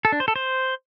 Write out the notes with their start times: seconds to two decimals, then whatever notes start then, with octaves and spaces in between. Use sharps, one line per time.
0.05 A4
0.12 D4
0.20 C5
0.28 A4
0.36 C5